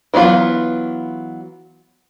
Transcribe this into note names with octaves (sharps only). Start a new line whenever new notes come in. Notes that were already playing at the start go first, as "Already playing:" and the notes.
E3 F#3 B3 F4